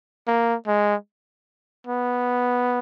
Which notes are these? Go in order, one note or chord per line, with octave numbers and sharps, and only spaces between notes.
A#3
G#3
B3